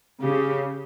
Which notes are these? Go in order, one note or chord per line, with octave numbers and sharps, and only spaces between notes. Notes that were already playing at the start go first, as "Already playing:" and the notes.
C#3 G4